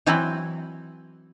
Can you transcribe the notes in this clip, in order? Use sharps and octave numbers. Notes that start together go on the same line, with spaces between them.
E3 F#3 C4 E4 B4